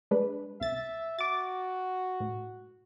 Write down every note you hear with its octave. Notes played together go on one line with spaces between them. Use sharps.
G#3 D4 B4
C2 E5 A6
F#4 D6 A6
A2